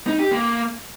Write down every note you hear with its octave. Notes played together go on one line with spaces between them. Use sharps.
D#4
G4
A#3